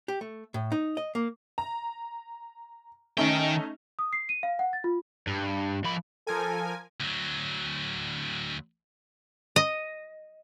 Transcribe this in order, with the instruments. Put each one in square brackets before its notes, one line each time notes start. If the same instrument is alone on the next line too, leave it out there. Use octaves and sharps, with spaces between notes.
[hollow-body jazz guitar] G4
A3
A2
D#4
D#5
A#3
[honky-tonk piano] A#5
[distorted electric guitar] D#3 G5 [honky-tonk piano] A3 C#4 D#4
[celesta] D#6
C7
D#7
F5
F#5
A6
F4
[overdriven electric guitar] G2
F3 B5
[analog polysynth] F3 A#4 G#5 [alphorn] A4
[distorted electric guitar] D2 F#3
[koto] D#5